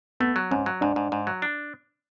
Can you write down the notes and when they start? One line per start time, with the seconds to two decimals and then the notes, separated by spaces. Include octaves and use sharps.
0.20 A3 B3
0.36 F#3
0.51 G#2 C#4
0.66 F#3
0.81 G#2 D4
0.96 G#2
1.12 G#2
1.27 F#3
1.42 D4